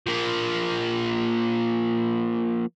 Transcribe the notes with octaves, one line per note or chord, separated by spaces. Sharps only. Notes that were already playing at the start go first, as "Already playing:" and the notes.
F3 A#3